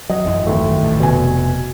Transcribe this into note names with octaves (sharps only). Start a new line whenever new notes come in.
F#3 D#5
G#1 F#2 E3
D#2 A3
A1 A2
F1 B2 G#5